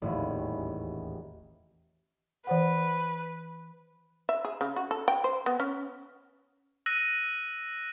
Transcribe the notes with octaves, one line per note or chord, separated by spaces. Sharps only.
D#1 A1 E2
E3 B4 C5 F#5
E5
G#4
C#3
F#4
A4
G5
C5
B3
C#4
E6 F#6 A#6 D#7